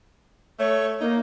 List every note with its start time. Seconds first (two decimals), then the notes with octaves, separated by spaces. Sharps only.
0.60 A3 C#5
1.01 A#3 D#4